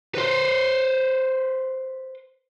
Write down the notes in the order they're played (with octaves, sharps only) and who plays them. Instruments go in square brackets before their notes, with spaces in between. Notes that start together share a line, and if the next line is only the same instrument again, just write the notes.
[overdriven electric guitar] B4 C5